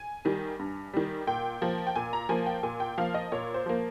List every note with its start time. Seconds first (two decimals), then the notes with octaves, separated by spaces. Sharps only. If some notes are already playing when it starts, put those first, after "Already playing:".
Already playing: G#5
0.25 D#3 G3
0.59 G2
0.93 D#3 G3
1.27 A#2 G5
1.61 F3 A#3
1.87 G5
1.96 A#2 G#5
2.13 A#5
2.29 F3 A#3 G#5
2.46 G5
2.63 A#2 G#5
2.80 G5
2.98 F3 A#3 F5
3.14 D#5
3.32 A#2 C#5
3.54 C5
3.66 F3 A#3